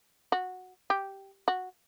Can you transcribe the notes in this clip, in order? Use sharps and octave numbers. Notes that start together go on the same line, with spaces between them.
F#4
G4
F#4